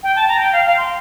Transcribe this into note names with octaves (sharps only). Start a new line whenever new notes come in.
G5
A5
A#5
G5
F5
F5
C6